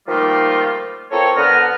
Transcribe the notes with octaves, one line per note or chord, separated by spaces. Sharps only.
D#3 F3 G3 A3 A#3 F4
C4 F4 A4 A#4 C#5
D3 B3 A#5 F6